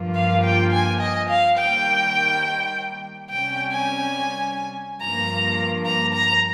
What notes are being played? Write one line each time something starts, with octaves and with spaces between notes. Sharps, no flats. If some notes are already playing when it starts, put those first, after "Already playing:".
Already playing: G2 F3 A#3 F4
F5
G5
G#5
D#5
F5
D#3 G3 A#3 G5
C3 G3 C#4 G5
G#5
G2 F3 A#3 A#5
A#5
A#5